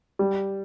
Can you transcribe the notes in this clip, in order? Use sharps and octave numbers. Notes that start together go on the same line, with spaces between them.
G3